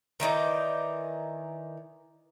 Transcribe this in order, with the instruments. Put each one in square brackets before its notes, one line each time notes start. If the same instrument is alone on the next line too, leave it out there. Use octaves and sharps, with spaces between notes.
[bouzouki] D#3 E3 D#4 D5